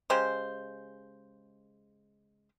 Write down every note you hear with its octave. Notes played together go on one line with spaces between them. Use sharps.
C#3 G#3 G4 C5